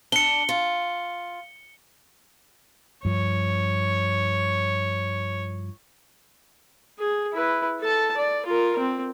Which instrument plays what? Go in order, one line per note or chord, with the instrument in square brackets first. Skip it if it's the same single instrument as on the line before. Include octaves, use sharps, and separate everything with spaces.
[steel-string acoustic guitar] D4 [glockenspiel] C#7 G7
[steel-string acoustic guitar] F4
[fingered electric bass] G2 F3 [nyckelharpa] C#5
[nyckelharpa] G#4
E4 B4
A4 A5
D5
F4 A#4
C4